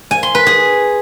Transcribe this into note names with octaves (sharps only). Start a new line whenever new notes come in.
G#5
C6
B4
G#4